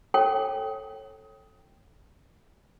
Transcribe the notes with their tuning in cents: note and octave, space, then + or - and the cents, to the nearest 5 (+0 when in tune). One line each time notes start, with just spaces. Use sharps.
A4 +0 C#5 -25 G5 +0